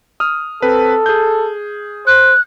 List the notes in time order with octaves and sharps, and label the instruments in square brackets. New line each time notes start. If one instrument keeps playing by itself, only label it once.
[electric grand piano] D#6 F6
[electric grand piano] C4 B4 [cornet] A4
[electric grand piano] G#4 G6
[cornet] C5 [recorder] F#6